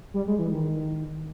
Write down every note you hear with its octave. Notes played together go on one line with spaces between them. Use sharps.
G3
G#3
E3
D#3